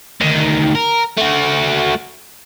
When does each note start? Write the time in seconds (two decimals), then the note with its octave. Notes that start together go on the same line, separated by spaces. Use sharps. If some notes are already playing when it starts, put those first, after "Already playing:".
0.21 D2 D#3
0.75 A#4
1.18 A3 F#4